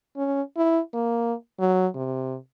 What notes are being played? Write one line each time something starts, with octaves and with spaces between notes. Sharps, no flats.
C#4
E4
A#3
F#3
C3